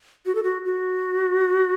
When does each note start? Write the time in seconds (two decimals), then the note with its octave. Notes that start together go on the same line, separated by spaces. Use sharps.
0.26 F#4
0.35 A4
0.43 F#4
0.65 F#4